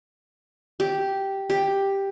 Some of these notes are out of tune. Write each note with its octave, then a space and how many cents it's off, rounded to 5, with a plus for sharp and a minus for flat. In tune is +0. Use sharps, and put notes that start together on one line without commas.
G4 -5
G4 +5